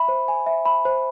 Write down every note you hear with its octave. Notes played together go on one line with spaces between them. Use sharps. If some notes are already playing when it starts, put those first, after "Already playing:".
Already playing: E5 B5
C5
G#5
E5
B5
C5